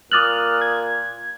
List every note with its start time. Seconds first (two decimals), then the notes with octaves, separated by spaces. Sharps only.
0.12 A#2 D6 D#6 F6 F#6 A6 F#7
0.61 G#6